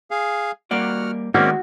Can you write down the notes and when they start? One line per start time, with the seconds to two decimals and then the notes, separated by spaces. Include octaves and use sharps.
0.11 G#4 F5
0.71 G3 A#3 F#4 D5 F#5 F6
1.34 D#3 G#3 A#3 C4 C#4 F#4 D5